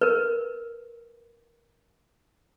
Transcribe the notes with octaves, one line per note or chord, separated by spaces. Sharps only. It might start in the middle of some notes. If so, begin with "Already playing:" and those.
A#4 B4